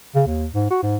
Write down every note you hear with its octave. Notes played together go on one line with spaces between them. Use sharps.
C#3
D#2
G#2
F#4
G#2